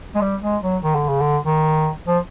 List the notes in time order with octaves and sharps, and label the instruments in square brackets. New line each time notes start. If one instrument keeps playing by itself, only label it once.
[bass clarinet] G#3
G3
G#3
F#3
D#3
D3
C#3
D3
D#3
F3